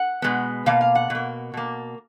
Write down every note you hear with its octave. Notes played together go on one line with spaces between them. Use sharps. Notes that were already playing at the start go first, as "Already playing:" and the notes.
Already playing: F#5
B2 G#3 B3
B2 A#3 F5
F5
F#5
B2 A#3
B2 A#3